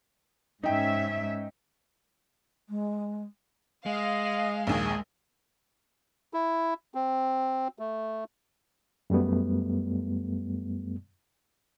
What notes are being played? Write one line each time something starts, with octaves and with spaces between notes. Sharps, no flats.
G#2 C#4 D#4 E5 G5
G#3
G#3 D#5 F5
A#1 D#2 G#4
E4
C4
A3
F#2 G3 A3 B3